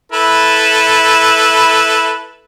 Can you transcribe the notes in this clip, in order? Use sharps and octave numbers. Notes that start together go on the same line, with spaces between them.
E4 A4 B4